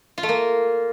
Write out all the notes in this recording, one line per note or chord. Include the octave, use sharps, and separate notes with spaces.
F4
A3
A#3